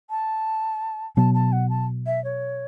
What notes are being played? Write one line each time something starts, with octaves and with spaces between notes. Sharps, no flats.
A5
B2 F#3 B3 A5
A5
F#5
A5
E5
C#5